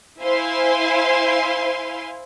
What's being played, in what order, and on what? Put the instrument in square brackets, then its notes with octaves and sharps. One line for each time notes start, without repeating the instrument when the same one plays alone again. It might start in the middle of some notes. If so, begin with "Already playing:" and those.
[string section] E4 C5 F5 G#5 C6